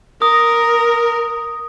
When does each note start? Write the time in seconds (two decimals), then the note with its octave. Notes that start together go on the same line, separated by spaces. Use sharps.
0.22 A#4 D#6